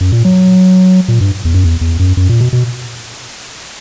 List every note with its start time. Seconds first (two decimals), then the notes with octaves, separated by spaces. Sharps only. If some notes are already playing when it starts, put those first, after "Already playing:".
0.01 F#2
0.12 A#2
0.25 F#3
1.08 A#2
1.21 G2
1.45 E2
1.54 F#2
1.64 E2
1.81 E2
1.99 F#2
2.17 F#2
2.29 A#2
2.41 B2
2.53 B2